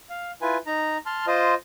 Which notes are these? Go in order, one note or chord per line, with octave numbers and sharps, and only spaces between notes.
F5
E4 F4 B4 G#5
D#4 A#5
A5 C6 F6
F4 C5 D#5